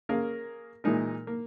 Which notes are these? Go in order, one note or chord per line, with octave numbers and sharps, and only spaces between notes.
A#3 C#4 G#4 A#4 F5
A#2 E3 G#3 D#4 A#4
A#3